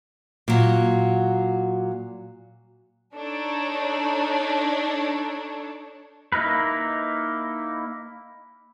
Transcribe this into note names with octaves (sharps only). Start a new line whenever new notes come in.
A#2 F#3
D4 D#4 A4 C#5
A#3 D#4 E4 A#4 B4